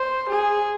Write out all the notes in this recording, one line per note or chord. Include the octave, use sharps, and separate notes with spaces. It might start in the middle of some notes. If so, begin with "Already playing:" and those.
Already playing: C5
G#4